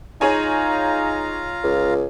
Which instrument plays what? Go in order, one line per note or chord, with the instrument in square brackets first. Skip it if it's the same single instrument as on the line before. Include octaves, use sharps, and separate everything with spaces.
[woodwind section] D#4 [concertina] F4 F5 A#5 [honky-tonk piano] G#4 C#5 G#5
[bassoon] C#2